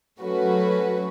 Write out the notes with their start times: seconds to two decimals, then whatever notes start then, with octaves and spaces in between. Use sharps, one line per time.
0.19 F#3 A3 C#4 F#4 B4